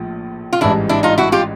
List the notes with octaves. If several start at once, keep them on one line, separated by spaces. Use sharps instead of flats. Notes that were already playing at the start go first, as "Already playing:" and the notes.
Already playing: A#1 A2 F3
F4
A1 G#2 E3 G3 D4 E4
D4 E4
D#4 F4
E4 F#4
F4 G4